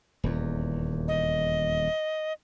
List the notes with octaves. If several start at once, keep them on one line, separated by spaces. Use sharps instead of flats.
D#1 E2
D#5